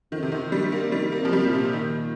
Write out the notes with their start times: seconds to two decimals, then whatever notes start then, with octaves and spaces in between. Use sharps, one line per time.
0.12 F2 D#3
0.23 C3
0.32 D#3
0.52 G2 G3
0.72 A#3
0.89 C3
0.92 D#3 G3
1.12 A#3
1.19 C3
1.25 F3
1.33 G3
1.39 C3
1.46 A#2
1.53 C3
1.73 D#3